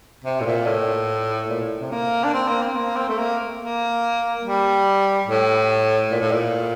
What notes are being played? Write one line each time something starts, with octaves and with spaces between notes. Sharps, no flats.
C3
A2
A#2
A2
A#2
C3
A#3
D4
C4
A#3
C4
A#3
C4
A3
A#3
A#3
G3
A2
A#2
A2
A#2